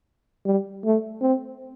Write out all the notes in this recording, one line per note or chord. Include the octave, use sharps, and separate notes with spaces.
G3
A3
C4